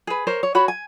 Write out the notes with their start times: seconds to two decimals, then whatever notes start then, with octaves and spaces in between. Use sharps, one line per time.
0.07 G#4 B4
0.27 A#4 C5 C#5
0.43 C#5
0.55 F#4 C#5 B5
0.68 G#5